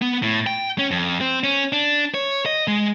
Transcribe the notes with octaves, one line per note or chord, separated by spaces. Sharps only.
B3
A2
G5
C#4
F2
C4
C#4
D4
C#5
D#5
G#3